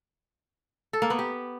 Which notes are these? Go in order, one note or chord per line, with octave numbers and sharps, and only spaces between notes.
A4
A#3
B3
G4